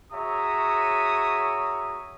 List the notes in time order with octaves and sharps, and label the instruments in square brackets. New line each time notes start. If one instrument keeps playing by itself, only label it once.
[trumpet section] F#4 G#4 C#5 E5 A#5 D#6